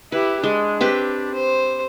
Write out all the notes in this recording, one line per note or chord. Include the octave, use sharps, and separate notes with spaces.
E4 G4 B4
G#3 D4
C4 G4 B4
C5